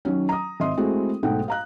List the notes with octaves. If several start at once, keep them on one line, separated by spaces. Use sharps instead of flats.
D#3 F#3 C#4
A#5 D#6
G#1 D#5 E5 C6 D#6
G#3 A3 C4 E4 F#4 G#4
B1 G#2 A3 F#5 G5
F5 A#5 F#6